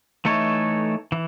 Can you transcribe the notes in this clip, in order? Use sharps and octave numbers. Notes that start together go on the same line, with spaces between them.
E3 A3 D#4 A4 C#5
E3